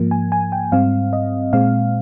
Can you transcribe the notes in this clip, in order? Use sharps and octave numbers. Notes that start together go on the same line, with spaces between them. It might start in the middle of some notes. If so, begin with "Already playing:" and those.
Already playing: G#2 F3 A#3
G#5
G#5
G5
G#2 G3 C4 F5
D#5
A#2 G#3 C4 F5